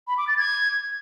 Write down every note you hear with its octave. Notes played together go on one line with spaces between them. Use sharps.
B5
D6
A6
G#6